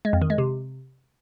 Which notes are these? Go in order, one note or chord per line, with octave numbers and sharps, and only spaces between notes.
G#3
F2
D#3
G#3
C3